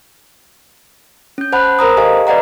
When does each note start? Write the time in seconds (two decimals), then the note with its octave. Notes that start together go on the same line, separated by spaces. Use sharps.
1.38 C#4 G6
1.52 C5 F#5 A5 B5 F#6
1.79 A#4 C5 A#5 D#6
1.97 G4 A4 D#5 F5 G#5
2.27 B4 D5 D#5 F#5 A#5